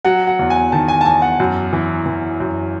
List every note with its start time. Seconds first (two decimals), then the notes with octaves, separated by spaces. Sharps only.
0.05 F#3 F#5
0.27 F#5
0.39 E2
0.50 G#5
0.72 D#3 A5
0.88 G#5
1.01 A5
1.05 E2 G#5
1.22 F#5
1.40 F#2
1.73 E3
2.06 E3
2.40 F#2